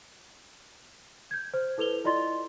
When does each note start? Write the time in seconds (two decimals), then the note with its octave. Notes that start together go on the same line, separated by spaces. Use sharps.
1.31 G6 G#6
1.54 C5
1.78 E4 A4 B4 F7 G7
2.04 E4 F4 D5 D#5 C6 A6